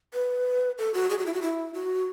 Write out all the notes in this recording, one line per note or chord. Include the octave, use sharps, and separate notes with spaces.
B4
A4
F#4
G#4
F#4
E4
F#4
E4
F#4